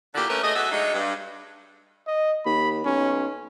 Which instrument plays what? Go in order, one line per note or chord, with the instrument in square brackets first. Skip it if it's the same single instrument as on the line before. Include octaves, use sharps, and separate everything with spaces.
[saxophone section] G2 A#2 D3 E4 F#4 G4
G2 A3 A#3 C#4 A#4 B4
A2 A3 G#4 D#5
B2 F#4 G#4 A4 E5
F#3 G#3 A3 D4 D#4 F#4
G2
[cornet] D#5
[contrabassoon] D#2 [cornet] B5
[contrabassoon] B1 [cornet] C#4